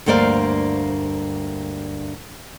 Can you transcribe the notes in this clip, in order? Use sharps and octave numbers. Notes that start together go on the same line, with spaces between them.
D2 G2 A#3 C5 D5 F5